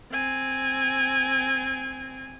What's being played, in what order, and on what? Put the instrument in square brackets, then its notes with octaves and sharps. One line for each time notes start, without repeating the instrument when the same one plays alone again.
[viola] C4 G#5